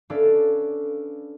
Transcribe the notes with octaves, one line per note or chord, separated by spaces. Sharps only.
C#4 D4 A4 B4 D5 F5